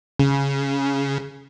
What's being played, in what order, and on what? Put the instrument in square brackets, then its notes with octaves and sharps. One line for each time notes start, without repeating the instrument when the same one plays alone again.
[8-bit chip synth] C#3